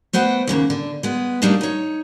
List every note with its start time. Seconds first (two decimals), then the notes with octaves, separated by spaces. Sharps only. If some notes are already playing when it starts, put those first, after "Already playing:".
0.13 A3 B3 C5 F#5 G5
0.47 D#2 C#3 A#3
0.70 D3
1.03 G#3 B3
1.42 G3 A3 A#3 D4 D#4
1.61 D#4 C#5